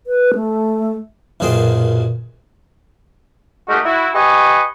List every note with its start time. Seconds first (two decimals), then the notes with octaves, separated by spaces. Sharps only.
0.07 B4
0.35 A3
1.40 B1 F#2 A#2 G#4 C5 G5
3.69 G#3 A3 D#4 F#4 G4 A#4
3.85 E4 F#4
4.15 G4 B4 D#5 G#5 C#6